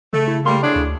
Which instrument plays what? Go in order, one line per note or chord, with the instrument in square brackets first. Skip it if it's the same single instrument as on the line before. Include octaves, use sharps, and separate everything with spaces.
[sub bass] C#3 [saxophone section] A3
[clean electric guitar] E4
[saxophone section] G3 A#3 [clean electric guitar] A3 C6
[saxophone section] A2 D4 [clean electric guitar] G#4 C#5 D5
[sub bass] D2